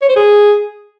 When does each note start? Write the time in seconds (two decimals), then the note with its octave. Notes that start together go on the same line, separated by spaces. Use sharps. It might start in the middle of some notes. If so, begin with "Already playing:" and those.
0.02 C#5
0.09 C5
0.16 G#4